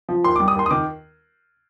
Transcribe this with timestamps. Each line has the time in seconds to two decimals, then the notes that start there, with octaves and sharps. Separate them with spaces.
0.09 F3
0.24 D#2 C6
0.36 G3 D6
0.48 D#6
0.55 D#2 C6
0.66 D#6
0.71 D#3 D6